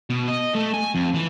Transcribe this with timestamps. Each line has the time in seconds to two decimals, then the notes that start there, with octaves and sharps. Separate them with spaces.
0.10 B2
0.28 D#5
0.55 A3
0.74 G#5
0.95 F2
1.14 E3